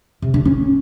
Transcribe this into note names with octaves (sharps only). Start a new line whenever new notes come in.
C3
D4
C#4